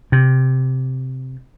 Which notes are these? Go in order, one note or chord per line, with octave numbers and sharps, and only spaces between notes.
C3